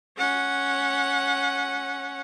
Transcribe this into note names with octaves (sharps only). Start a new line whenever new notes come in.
C#4 F#5